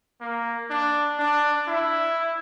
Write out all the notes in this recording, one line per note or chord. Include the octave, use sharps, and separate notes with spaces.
A#3
D4
D4
E4